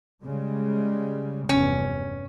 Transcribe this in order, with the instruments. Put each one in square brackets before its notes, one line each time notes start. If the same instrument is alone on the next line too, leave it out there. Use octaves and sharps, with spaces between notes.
[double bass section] C#3 G3 G#3
[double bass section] F1 E2 G2 [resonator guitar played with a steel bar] C#4